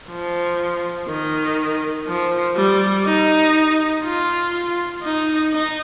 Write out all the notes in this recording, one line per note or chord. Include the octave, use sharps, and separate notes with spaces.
F3
D#3
F3
G3
D#4
F4
D#4
D#4